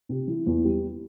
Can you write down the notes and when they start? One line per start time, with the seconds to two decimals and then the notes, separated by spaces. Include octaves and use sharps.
0.09 C3
0.27 E3
0.46 E2
0.65 G3